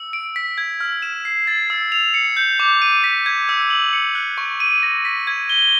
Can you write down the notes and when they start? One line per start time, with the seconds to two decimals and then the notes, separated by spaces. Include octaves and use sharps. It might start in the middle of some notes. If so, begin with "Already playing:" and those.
Already playing: E6
0.13 D7
0.36 B6
0.58 G#6
0.81 F6
1.02 E7
1.25 C7
1.47 A6
1.70 E6
1.92 F7
2.14 C#7
2.37 G6
2.60 D6
2.82 D#7
3.04 B6
3.26 G#6
3.49 E6
3.70 F#7
3.93 C#7
4.15 F#6
4.38 C#6
4.60 D#7
4.83 A#6
5.05 B6
5.27 G#6
5.49 G7